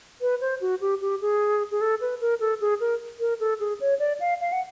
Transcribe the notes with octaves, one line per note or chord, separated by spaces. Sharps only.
B4
C5
F#4
G4
G4
G#4
G#4
A4
B4
A#4
A4
G#4
A#4
A#4
A4
G#4
C#5
D5
F5
F5
F#5